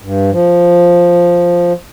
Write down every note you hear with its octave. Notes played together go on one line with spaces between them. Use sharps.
G2
F3